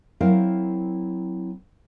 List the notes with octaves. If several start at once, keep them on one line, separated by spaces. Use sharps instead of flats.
F#3 C4 E4 A#4 C5 F5